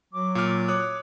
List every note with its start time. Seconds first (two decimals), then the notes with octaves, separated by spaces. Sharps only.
0.13 F#3 D6
0.35 A#2 F6
0.68 C#5 D6 D#6 F#6